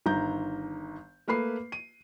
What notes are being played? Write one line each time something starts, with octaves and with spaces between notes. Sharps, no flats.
G1 D#3 A#5 G6
A3 A#3 B4 B5 C7
D#7